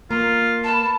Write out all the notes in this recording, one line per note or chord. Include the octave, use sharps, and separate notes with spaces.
A#3 F4 A#5 C6 C#6
A4 B4 A5 B5